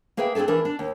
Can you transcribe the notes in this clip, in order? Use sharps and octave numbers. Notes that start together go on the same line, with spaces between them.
A#3 G#4 B4 E5 G5
C4 D4 F4 G#4 A4
E3 D4 A#4
D4
D#2